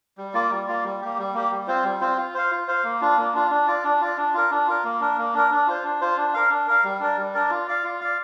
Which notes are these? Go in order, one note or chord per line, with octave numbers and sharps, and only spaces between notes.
G3
A#3 F4 D5
G3
A#3 F4 D5
G3
A#3 G4
G3
A#3 G4
G3
C4 F4 C5
G3
C4 F4 C5
F4
C5 F5
F4
C5 F5
A#3
D4 F4
A#3
D4 F4
D4
F4 D5
D4
F4 D5
D4
F4 A#4
D4
F4 A#4
A#3
D4 A#4
A#3
D4 A#4
D4
F4 C5
D4
F4 C5
D4
A#4 F5
D4
A#4 F5
G3
D4 A#4 D5
G3
D4 A#4 D5
F4
D5 F5
F4
D5 F5